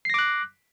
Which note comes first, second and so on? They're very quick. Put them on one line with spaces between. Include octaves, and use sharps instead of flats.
C7 A#6 D6 F#6